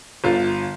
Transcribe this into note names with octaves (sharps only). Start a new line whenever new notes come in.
G1 F4